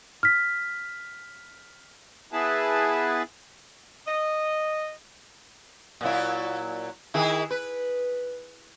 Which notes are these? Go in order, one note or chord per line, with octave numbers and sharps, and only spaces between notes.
F6 B6
B3 E4 G#4 B4 A5
D#5
A#2 F#3 E4
D#3 E4 G#4
B4